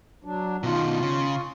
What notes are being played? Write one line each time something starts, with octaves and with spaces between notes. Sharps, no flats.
F#3 D4
B2 D#3 F4
C#3